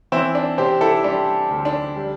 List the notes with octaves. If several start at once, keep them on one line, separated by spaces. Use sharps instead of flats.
E3 C4 E4
D4
C3 G4 C5
E4 A4
G3 D4 G4
D2
D4
G3